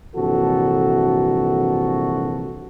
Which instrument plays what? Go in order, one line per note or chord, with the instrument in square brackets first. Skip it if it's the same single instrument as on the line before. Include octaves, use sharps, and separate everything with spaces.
[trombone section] A#1 G2 C3 E3 F#4 A4